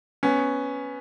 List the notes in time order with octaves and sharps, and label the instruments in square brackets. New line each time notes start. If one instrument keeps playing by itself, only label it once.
[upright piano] B3 C#4